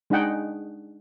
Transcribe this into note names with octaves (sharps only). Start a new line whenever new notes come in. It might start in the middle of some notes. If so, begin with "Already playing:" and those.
G#3 D4 D#4 G#4 F#5 G5